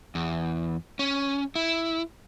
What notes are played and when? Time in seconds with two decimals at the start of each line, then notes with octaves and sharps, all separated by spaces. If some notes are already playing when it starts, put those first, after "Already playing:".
0.15 E2
0.99 C#4
1.55 E4